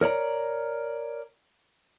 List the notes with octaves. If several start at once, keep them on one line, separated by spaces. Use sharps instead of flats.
A#4 C#5 D5 A#5